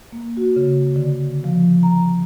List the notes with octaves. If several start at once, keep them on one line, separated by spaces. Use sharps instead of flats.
A#3
F#4
C#3
D3
F3
A#5